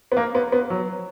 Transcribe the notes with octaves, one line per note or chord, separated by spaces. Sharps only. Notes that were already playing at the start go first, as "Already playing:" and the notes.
B3
A#3
B3
B3
F#3